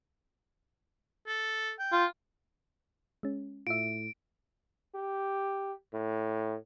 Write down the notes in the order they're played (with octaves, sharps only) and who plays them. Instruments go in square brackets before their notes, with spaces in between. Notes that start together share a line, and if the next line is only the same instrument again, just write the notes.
[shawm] A4
G5
[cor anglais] F4
[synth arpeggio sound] G#3 C#4
[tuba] A2 [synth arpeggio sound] F4 E5 [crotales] D7
[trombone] G4
A2